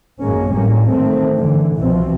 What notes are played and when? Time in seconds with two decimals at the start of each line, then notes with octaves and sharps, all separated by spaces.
0.23 G#1 F#2 G#3 A#3 C#4
0.52 A2 G3 A#3 C#4
0.90 E2 D#3 A3 C4
1.36 G2 D3 E3
1.77 C2 B2 E3 F3 C4